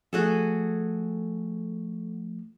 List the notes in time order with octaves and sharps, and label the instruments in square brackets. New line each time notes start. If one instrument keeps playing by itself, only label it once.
[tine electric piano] F3 A3 [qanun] F#4 G#4 A4